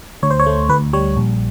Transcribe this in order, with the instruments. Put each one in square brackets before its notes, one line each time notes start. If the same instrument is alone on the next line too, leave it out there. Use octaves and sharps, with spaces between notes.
[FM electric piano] D2 C#5
C5
C#5
A3
D2 B4
G3 C#5
A#1